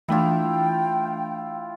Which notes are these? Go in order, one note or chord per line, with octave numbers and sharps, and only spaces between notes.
E3 A3 D4 E4 F4 G5